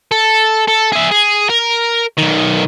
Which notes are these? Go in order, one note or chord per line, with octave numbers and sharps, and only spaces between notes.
A4
A4
G#4 E5
G#4
A#4
B1 D#3